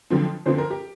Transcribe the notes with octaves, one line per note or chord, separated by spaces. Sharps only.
F2 D3 F3 C4
F2 D3 F3 C4 C5
A#4
G4